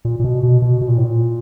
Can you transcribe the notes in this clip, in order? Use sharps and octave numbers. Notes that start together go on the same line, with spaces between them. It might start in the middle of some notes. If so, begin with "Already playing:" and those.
A#2
A#2
B2
B2
B2
B2
A#2
A2
A#2